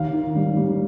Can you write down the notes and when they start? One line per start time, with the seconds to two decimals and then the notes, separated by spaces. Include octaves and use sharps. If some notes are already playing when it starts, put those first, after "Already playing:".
Already playing: D#2 F5
0.13 D#3
0.35 G3
0.57 G3